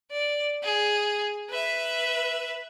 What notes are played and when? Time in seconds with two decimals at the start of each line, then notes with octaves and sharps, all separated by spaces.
0.11 D5
0.63 G#4
1.50 B4 E5